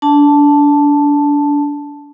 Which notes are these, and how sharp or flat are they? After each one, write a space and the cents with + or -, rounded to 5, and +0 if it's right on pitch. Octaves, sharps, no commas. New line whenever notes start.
D4 -25 A5 +0